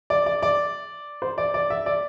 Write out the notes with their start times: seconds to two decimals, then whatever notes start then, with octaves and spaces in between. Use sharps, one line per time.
0.10 D5
0.26 D5
0.42 D5
1.22 C5
1.38 D5
1.54 D5
1.70 E5
1.86 D5